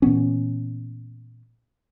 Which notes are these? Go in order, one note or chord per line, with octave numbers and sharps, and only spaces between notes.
A#2 E3 B3 C#4